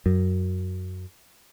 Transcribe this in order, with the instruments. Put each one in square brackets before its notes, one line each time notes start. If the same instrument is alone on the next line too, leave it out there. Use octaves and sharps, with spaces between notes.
[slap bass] F#2